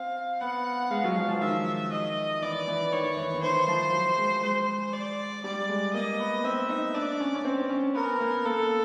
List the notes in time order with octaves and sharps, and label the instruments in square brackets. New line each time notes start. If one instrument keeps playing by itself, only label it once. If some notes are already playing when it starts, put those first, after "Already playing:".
Already playing: [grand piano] C4 [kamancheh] F5
[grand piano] B3 [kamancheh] F#5
[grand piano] G#3 [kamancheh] F5
[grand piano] F#3
F3
F3
[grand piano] D#3 [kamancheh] E5
[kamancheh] D#5
[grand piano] E3 [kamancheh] D5
[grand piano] E3
[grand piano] D#3 [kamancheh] C#5
[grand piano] E3
D#3
[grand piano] E3 [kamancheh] C5
[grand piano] F3
F#3
G#3
[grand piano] G#3 [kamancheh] C5
[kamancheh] D5
[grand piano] G3 [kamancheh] D5
[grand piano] G#3
[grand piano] A#3 [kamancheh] D#5
[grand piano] B3
[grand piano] C4 [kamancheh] E5
[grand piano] D#4
[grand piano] D4 [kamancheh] D5
[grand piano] C#4
C#4
C4
C#4
[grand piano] B3 [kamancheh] A#4
[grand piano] B3
A#3
[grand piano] A#3 [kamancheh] A4